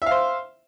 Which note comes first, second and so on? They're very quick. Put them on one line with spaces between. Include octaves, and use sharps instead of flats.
E5 F5 C5